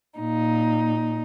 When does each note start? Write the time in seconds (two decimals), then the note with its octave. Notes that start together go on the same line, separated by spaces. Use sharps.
0.19 A#2 D#4